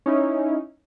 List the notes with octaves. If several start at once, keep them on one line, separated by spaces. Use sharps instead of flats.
C#4 D#4 E4